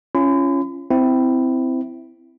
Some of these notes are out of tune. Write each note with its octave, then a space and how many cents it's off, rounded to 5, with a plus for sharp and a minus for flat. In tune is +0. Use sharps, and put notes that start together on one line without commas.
C#4 +0 F4 -35 B5 +45
C4 -15 E4 +0